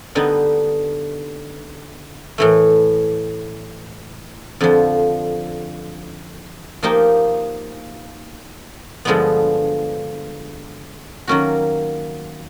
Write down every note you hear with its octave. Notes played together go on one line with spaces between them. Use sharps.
D3 G3 B3 D#4
A2 E3 A3
F2 D3 F3
F3 A#3 D#4 G4
G2 D3 F3 G#3 B3
D#3 F#3 A#3 C#4 F#4